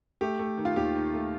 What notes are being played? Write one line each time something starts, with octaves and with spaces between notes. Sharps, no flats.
A3 G4
A3
D#3
F4
D#2 G4
D#3
A3